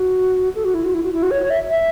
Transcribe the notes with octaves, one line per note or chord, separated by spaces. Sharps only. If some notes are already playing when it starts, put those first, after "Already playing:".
Already playing: F#4
A4
F#4
E4
F#4
E4
F#4
E4
F#4
C#5
C#5
E5
E5